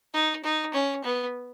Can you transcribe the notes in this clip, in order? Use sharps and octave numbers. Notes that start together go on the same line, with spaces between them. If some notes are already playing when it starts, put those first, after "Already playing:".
D#4
D#4
C#4
B3